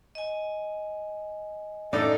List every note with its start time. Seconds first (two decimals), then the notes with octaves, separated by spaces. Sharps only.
0.15 D#5 G#5
1.93 A2 D4 D#4 A4 D5